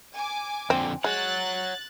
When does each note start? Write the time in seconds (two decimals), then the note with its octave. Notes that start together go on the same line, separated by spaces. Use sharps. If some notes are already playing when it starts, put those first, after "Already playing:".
0.15 G#5 D6
0.70 F2 D3 C4
1.04 G#3 C#5 F#5 F#6 A6